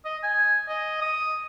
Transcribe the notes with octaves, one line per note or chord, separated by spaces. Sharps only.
D#5
G#5
D#5
D#6